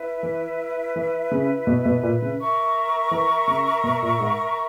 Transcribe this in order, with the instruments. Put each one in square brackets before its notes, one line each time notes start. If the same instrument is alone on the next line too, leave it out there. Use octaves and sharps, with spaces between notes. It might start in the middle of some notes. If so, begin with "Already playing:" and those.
Already playing: [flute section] E4 B4 E5
[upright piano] E3
E3
C#3
B2
B2
A#2
C#3
[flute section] A#4 E5 A#5 C#6
[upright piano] E3
C#3
B2
A#2
G#2